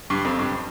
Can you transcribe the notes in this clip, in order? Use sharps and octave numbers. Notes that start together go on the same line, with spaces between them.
G2
F2
G2